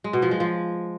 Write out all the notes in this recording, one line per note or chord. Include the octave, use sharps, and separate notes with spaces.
G#3
B2
F3
G#3
F3